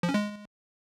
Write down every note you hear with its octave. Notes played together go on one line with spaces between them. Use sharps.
F3
C#4
G#3